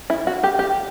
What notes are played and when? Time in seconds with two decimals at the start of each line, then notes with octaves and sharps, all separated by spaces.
0.10 E4
0.27 F#4
0.43 G4
0.59 G4